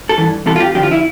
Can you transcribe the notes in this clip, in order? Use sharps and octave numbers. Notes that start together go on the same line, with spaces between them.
A4
G2 E3
C2 C3 E3 A4
F4
G4
F2 D3 F3 G4
F4
E4